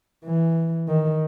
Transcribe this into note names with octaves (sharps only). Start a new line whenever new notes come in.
E3
D#3